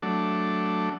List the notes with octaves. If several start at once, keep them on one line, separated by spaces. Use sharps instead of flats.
F#3 A3 D4